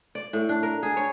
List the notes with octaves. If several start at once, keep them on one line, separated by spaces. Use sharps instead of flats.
D5
A2
D4
A#4
G#4
C#5